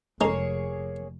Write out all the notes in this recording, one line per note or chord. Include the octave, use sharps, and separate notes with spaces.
F1 G#3 A#3 C#4 D#4 G#4 A4 C#5